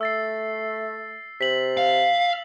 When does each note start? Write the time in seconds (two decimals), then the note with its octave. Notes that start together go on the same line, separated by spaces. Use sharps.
0.01 A3 E6 A6 C7
1.41 C3 B6 F#7
1.77 F5